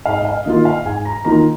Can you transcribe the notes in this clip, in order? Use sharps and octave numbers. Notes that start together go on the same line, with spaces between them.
G#2 F5
D#5
F5
D#3 A#3 F4 D#5
F5
G#2 G#5
A#5
D#3 A#3 F4 A#5